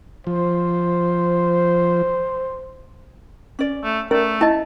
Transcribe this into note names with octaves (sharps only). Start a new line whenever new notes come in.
F3 C5
C#4 D5
A3
A3 C#4 A#4 D5
E4 D#5 A5